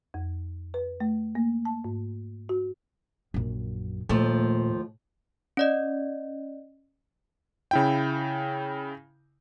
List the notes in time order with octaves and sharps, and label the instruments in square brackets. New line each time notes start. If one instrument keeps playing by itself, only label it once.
[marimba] F2
B4
A3
A#3
A5
G#2
F#4
[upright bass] A#1 F#2
[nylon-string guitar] D#2 F3 A3 [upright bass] A#2
[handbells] C#4 D5 D#5
[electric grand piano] C#3 E4 G5